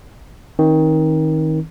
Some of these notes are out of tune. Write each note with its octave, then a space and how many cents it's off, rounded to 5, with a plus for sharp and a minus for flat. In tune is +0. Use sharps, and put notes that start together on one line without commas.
D#3 +20 C4 +45